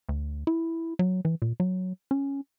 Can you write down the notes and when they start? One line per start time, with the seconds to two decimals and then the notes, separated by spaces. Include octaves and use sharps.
0.09 D2
0.47 E4
0.99 F#3
1.25 E3
1.42 A#2
1.60 F#3
2.11 C#4